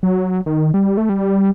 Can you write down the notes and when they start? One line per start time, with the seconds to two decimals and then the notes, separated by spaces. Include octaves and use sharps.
0.03 F#3
0.46 D#3
0.74 G3
0.97 A3
1.09 G3